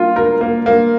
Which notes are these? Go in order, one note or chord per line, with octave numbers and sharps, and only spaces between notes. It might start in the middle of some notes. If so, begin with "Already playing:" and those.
Already playing: A#3 F4
A#4
A#3
A#3